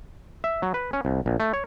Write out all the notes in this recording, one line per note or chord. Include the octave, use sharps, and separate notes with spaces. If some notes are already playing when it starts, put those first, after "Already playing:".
E5
F#3
B4
C#4
C2
A#1
A3
C#5